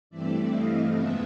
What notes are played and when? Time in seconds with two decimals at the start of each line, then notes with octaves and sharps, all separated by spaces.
0.10 G2 E3 A3 C4 D5 E5
0.51 D#5 F5
0.93 F2 C#3 F3 G#3 B3 E5 F#5